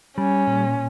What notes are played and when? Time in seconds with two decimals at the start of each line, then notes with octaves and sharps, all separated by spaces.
0.18 G3 C#4
0.47 A#2